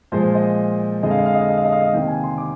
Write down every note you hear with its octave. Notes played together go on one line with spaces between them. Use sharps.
A#2 F3 G#3 C5
D#5
F2 D3 G#3 D#5
F5
D#5
F5
D#5
F5
D#5
F5
D#5
F5
D#5
C3 D#3 A#3 G5
G#5
C6
D6